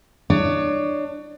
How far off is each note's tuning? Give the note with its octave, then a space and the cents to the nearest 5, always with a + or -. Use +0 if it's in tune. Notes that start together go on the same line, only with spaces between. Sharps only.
D4 +30 C#5 +30